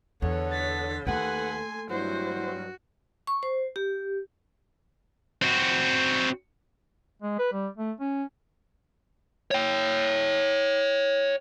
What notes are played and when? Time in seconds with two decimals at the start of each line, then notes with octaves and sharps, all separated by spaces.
0.22 E2 D3 B3 A4 C#5
0.52 A6 B6
1.07 D#2 A3 A#3 A4 B4 F#5 G#5 C6
1.90 G2 F#3 E4 F#4 C5
3.27 C#6
3.43 C5
3.76 G4
5.42 C4 F#4
7.22 G#3
7.39 B4
7.53 G3
7.77 A3
8.00 C#4
9.51 C#5 G5